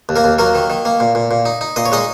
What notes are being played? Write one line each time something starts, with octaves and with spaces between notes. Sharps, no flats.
D#2
A#3 A#4
D#2
F#3 A#3 A#4
D#3
D#3
A#3
A#2
A#2
A#2
D#4
D#4
A#2 D#5
C#5
G#3 D#4 D#5